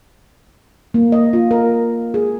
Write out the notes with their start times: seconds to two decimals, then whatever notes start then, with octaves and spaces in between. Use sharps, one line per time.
0.94 A#3
1.12 D#5
1.33 F4
1.51 A#4
2.14 G#4